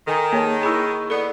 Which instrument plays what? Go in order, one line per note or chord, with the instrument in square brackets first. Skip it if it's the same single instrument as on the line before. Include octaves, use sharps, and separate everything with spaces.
[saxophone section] D#3 [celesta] A4 G#5 A#5
[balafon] A#3 [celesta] G#4 C#5 A5
[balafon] E4 G#4 [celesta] B5 C#6 E6
[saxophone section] B3 [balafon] A4 D5